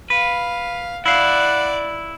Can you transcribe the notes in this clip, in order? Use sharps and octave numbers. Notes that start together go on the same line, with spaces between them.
B4 F5
E4 D5 F5 F#5